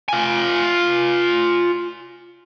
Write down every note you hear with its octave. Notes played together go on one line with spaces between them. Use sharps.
F4 G#5